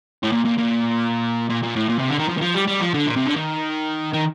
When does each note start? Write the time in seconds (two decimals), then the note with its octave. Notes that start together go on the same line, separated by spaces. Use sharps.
0.23 A2
0.32 A#2
0.45 A#2
0.58 A#2
1.50 A#2
1.63 A#2
1.76 A2
1.89 A#2
1.99 C3
2.09 D3
2.18 D#3
2.28 F3
2.37 D#3
2.41 F3
2.54 G3
2.67 G3
2.80 F3
2.94 D3
3.07 A#2
3.16 C3
3.26 D3
3.36 D#3
4.14 D#3